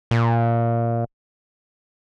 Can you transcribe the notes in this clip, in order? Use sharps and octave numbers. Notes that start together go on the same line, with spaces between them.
A#2